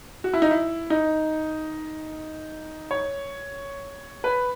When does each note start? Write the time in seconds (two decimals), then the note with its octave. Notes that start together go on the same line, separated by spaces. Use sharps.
0.24 F#4
0.34 E4
0.42 D#4
0.51 E4
0.90 D#4
2.91 C#5
4.24 B4